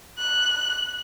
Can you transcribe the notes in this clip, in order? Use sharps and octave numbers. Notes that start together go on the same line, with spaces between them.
F#6